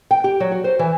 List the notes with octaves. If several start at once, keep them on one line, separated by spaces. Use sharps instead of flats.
G5
G4
F#3
F#4
C5
E3